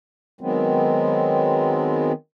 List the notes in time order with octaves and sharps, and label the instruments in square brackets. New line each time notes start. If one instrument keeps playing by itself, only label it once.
[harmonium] D#3 F#3 G#3 B3 C4